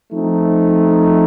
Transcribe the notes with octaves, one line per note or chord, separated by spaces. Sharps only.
F3 A3 C4 D#4